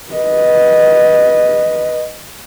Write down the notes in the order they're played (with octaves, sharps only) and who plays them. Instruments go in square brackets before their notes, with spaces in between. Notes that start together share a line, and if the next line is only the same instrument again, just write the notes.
[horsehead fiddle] B4 D#5